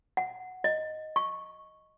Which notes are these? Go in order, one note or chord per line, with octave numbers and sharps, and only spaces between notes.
F#5
D#5
C#6